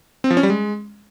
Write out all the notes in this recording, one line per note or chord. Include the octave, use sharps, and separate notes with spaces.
C4
F3
C#4
G3
G#3